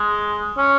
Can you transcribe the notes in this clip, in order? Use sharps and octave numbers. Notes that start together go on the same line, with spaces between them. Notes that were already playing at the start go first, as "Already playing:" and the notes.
Already playing: G#3
C#4